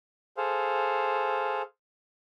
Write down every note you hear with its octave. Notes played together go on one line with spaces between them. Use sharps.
G#4 A4 C5 F5